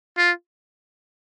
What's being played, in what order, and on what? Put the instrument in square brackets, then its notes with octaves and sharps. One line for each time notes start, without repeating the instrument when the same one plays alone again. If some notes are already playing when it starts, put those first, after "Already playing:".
[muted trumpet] F4